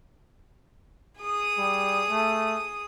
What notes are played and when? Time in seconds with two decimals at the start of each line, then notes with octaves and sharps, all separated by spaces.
1.20 G#4 D#6
1.58 G3
2.10 A3